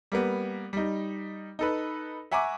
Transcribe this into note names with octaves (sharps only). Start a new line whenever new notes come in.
G3 A#3 B3
G3 D#4
D#4 A4 B4
E5 F#5 G#5 A#5 C#6 D6